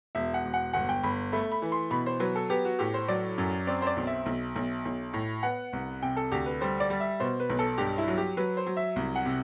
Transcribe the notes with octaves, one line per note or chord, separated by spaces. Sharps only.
E1 E5
F#5
E1
F#5
G1 F#5
G5
G1 B5
A3 B5
B5
E3
C6
B2 B5
C5
F#3 B4
A4
B3 G4
F#4
A2 G4
C5
F#3 D5
F#2
C4 D5
C5
D5
B1
E5
B1
B1
B1
A2
B3 F#5
C2
C3 G5
A4
D2 G4
B4
G3 C5
D5
G3
E5
B2 C5
B4
B1
A4
G2 G4
E4
F#3
G4
F#3 B4
C5
F#3
E5
C2
F#5
C3